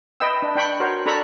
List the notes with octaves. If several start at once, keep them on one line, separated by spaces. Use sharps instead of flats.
B4 D#5 E5 G5 E6
D4
D4 G5 B5 C#6
F#4 A#4 C5 C#5
D4 A4 A#5 B5 C#6